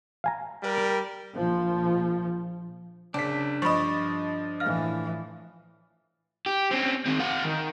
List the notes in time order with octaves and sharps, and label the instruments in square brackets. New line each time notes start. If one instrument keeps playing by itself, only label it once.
[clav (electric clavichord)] F5 G#5 A#5
[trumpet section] G3 A#4
[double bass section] A#1 F3
[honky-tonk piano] F#1 B6 [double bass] C#3 [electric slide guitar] D4
[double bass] G2 [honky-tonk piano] F3 D#5 [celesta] B5 C#6
[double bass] A2 E3 [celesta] F5 F6
[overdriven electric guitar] G4
C4 C#4
D#3 C4
F#4 F5
D#3